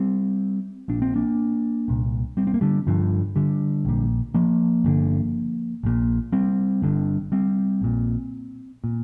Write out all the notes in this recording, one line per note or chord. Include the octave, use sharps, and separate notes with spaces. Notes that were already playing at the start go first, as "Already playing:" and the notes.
Already playing: G3 C4
A#1 A#2 D4
C4
A#3 D4
C2 A#2
G3 C4
C4
A#3
D3 G3
G1 G2 D3 F3
D3 G3
A#1 A#2
F3 A#3
G1 G2 D3
A#1 A#2
G3 C4
G1 G2 D3
G3 C4
A#1 A#2
A#2